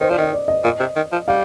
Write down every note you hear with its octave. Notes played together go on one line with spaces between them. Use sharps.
D#3 C5
F3 D5
D#3 D#5
D5
D#5
A#2
C3
D#3
F3
G3 F5